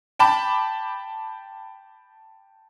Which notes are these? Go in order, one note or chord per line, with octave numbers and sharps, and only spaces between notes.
G5 A5 B5 D6